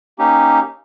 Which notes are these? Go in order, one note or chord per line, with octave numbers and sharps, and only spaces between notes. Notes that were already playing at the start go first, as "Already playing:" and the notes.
A#3 C#4 D#4 G4